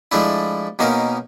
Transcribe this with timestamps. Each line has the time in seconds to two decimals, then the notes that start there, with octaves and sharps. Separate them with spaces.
0.12 F3 G#3 A3 D4 E4
0.79 B2 A#3 C#4 D#4 A#4